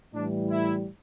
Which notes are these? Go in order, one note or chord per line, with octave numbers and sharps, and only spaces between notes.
A2 E3 G3 D4
E4